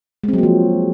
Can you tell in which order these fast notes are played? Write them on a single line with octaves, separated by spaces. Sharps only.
G#3 C4 F#3 A#3 F3